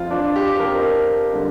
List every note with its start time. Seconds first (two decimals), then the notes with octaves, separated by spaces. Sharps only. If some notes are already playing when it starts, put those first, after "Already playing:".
Already playing: F2 F3 F4
0.11 D4
0.36 G4
0.56 G4
0.60 F2 F3 A#4
1.33 D3 G3